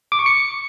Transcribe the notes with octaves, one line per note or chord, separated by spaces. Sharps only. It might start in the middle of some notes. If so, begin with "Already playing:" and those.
D6
C#6
C#7